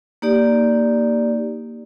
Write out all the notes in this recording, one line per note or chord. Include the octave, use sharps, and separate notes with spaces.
A#3 D#4 G4 D5